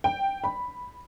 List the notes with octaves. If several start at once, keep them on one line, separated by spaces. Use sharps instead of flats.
G5
B5